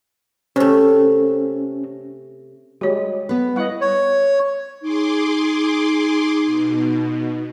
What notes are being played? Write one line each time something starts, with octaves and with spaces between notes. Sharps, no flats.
C3 A3 C#4
G3 G#3 F#4 C#5
B3 B4
G3 E4 D#5 F#5
C#5
D#4 G#4 C6 D6
B2